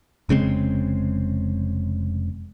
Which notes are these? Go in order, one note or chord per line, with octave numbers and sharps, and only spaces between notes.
F1 C#3 G#3 C4